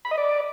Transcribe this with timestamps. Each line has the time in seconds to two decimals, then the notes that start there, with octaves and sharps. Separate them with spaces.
0.05 B5
0.11 D#5
0.18 D5